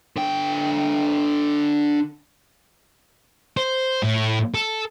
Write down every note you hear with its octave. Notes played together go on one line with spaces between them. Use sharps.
D3 G5
C5
A2
A4